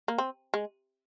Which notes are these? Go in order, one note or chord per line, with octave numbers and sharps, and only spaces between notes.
A#3
C4
G#3